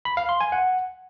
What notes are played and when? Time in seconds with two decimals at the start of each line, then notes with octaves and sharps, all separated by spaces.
0.05 B5
0.17 F5
0.29 C6
0.41 G#5
0.52 F#5